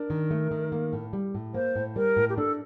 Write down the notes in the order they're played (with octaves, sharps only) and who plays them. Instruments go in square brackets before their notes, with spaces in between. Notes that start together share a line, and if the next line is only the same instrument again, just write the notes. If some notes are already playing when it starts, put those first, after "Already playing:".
Already playing: [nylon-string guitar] D4 [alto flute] A#4
[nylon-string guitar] D#3
A3
D#3
A#3
A2
G3
A2
[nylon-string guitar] A#3 [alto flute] C5
[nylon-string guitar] A2
[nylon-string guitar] G3 [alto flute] A#4
[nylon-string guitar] A2
[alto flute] G4
[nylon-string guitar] D4 [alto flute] A4